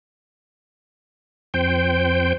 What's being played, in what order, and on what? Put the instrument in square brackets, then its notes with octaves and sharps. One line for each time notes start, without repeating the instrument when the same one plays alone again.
[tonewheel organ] F2 C5 G5